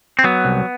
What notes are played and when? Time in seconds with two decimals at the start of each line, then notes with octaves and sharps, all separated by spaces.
0.19 C4
0.24 F#3 B3
0.45 C2